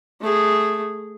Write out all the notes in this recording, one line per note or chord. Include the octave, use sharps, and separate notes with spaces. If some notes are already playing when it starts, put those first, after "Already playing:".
A3 G#4